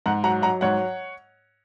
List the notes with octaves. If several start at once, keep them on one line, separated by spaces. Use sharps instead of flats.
G#2 F#5 A#5
F#3 F#5 A#5
F#3 F#5 A#5
G#2 C#5 F#5